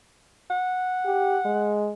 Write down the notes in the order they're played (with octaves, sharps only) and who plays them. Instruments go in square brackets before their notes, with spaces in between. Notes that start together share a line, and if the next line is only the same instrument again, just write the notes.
[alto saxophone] F#5
[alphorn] G4
G#3